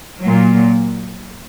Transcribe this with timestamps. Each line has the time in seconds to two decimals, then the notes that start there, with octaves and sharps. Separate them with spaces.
0.20 A#2 F#3